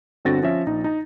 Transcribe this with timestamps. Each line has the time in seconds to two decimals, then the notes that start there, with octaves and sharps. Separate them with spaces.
0.25 G1 D3 C4 F#4 A6 A#6
0.43 F3 C#4 E5
0.66 A#1 D#4
0.84 D#4 A#5